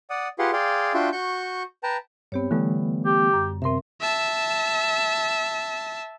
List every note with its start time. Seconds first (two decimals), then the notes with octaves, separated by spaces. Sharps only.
0.10 D5 F#5 D#6
0.39 F4 G4 G#4 B4 F#5 C6
0.53 G#4 D5 F5 G5 C6
0.94 D4 F4 F#4 E5 G5 C6
1.12 F#4 C#6 G6
1.83 B4 G5 A5 A#5
2.32 G2 B3 C4 G4 C#5
2.51 D3 E3 G3 A3 B3
3.05 G4
3.34 F#2
3.62 C3 C4 A#4 E5 C6
4.01 E5 A5